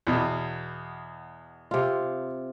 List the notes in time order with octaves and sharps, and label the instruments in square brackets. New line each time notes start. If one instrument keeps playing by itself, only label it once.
[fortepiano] E2 B2
[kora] C3 F4